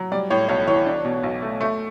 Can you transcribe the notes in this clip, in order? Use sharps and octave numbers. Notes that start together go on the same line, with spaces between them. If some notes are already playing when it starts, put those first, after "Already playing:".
Already playing: F#3
G3 D5
A2 C#5
B1 C#5
E3 C#5
D4
B2
B1
A3
A3